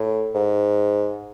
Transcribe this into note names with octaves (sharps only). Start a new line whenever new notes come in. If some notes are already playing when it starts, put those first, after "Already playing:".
Already playing: A2
G#2